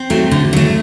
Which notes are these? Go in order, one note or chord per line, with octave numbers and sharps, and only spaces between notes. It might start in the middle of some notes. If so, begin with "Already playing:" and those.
Already playing: C4
F#3 A3
D3
F#3 A3